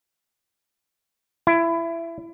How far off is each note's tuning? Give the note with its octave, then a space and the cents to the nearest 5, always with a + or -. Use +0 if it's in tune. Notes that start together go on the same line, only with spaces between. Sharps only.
E4 +20